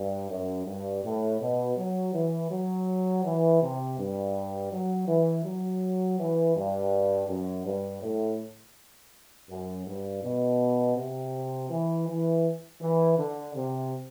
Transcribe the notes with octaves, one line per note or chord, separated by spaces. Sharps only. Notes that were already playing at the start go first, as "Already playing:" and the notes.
Already playing: G2
F#2
G2
A2
B2
F#3
E3
F#3
E3
C3
G2
F#3
E3
F#3
E3
G2
F#2
G2
A2
F#2
G2
B2
C3
E3
E3
E3
D3
C3